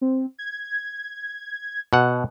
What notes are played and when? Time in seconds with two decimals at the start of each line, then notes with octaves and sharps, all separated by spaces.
0.01 C4
0.39 G#6
1.93 B2 F#5